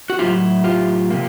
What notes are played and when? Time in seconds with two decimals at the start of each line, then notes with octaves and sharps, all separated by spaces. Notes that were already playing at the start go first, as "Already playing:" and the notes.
0.10 F#4
0.19 A2 F#3 A3 C#4 E4 F4 G4
0.64 F4 G4
1.10 C3 F3 A#3